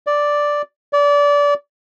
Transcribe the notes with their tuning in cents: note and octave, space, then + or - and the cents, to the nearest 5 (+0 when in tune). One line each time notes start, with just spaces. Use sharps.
D5 +0
D5 -25